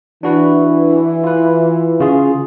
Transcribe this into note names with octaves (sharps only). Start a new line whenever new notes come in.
E3 D4 F#4 B4
F4 B4
C#3 F4 G#4